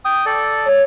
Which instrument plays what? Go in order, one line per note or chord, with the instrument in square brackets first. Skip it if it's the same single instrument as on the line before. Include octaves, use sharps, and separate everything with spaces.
[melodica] G5 D#6
A4 D5
[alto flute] C#5